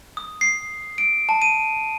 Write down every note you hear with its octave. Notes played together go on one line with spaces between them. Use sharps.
D#6
C7
D7
A5
D#7